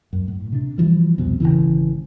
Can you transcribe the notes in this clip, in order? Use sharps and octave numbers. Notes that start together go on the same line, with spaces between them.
F#2
A2
C3 D4
E3 F3 G3
C2 F2 B2 C4
G#1 D#2 C#3 E3